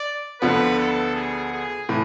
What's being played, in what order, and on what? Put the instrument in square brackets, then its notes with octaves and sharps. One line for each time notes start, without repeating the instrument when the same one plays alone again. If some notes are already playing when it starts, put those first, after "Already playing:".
Already playing: [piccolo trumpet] D5
[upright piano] D2 D3 F3 B3 [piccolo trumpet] B4
[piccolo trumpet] A4
G#4
G#4
[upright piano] A2 E3